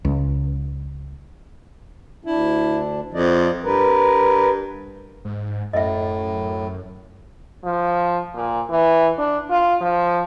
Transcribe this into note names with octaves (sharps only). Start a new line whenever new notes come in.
C#2
D2 D4 E4
F2 F3 D5 D#5
G2 A#4 B4
G#2
F#2 A2 D#5 E5
F3
A#2
E3
D4
F4
F3